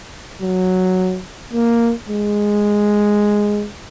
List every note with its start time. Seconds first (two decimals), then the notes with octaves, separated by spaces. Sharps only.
0.42 F#3
1.53 A#3
2.09 G#3